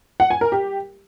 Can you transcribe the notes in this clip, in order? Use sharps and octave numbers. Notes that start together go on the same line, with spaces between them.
F#5
G#5
A#4
G4